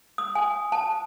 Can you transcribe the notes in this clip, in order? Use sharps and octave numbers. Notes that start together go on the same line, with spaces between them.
D#6
G#5
A5